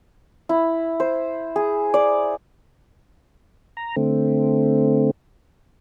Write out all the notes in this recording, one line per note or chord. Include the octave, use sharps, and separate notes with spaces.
E4
C5
G#4
D5
A#5
D3 A3 C4